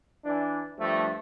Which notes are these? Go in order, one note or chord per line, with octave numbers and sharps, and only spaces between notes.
E3 D4
G2 F3 A3